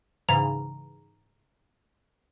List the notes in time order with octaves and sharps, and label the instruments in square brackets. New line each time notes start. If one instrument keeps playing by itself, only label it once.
[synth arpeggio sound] G#2 C#3 E3 [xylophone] A#5